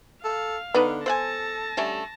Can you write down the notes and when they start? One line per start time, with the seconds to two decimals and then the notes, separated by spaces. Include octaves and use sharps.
0.24 A4 F5
0.74 D3 B3 D4 D#4 B4
1.06 A4 C5 F#5 G#5 A5 A#6
1.77 D3 G3 A3 C#4